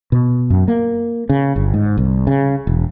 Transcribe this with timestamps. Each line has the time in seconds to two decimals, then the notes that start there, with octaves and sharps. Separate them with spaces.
0.12 B2
0.50 F#2
0.68 A#3
1.29 C#3
1.56 G1
1.74 G#2
1.97 C2
2.27 C#3
2.67 E1